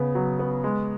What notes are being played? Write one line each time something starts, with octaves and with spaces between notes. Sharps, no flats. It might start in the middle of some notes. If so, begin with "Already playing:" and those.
Already playing: C#3 B3
F#3
B3
G#3